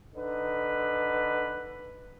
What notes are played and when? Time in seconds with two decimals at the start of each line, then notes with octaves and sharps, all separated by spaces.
0.15 D3 D#4 B4